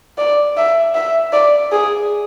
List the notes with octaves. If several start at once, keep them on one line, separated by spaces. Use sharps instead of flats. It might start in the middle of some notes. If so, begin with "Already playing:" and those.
D5
E5
E5
D5
G#4